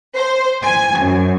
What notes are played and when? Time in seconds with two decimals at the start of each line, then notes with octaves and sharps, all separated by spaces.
0.16 C5
0.64 G#5
1.00 F#2